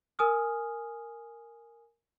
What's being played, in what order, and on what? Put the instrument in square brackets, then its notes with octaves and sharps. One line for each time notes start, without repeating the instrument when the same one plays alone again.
[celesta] A#4 G#5 D#6 F6